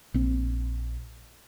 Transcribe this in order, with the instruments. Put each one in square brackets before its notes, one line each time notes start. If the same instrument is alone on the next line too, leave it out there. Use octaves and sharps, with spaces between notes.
[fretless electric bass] A#1 C4